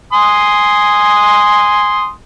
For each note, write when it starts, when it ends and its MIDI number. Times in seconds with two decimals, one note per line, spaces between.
0.13 2.10 80
0.13 2.10 84
0.13 2.10 87